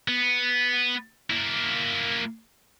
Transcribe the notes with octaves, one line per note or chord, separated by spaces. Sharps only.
B3
A#3 E4